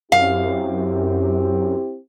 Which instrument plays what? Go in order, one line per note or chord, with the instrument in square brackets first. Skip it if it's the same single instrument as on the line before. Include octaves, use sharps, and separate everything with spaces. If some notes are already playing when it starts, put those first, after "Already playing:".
[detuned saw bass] F#2 [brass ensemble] C4 E4 G4 [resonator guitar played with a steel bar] F5